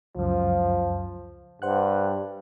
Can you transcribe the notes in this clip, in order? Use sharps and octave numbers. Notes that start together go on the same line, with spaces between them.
C#2 F#2 F3
G2 C5 F#5 F#6